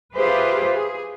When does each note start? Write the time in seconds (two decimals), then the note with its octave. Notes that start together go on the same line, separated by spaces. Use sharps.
0.15 F4 G4 G#4 B4 C5 E5
0.72 G#4